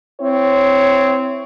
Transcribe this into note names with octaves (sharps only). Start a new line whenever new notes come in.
C4 E4 C#5